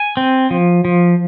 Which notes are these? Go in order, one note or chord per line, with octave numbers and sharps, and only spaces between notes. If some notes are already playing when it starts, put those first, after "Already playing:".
Already playing: G#5
C4
F3
F3